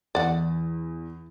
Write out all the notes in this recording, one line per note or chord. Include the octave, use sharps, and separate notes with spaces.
E2 D5 F#5